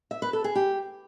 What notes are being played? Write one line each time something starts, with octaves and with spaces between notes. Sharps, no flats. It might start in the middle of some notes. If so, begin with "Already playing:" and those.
E5
B4
A4
G#4
G4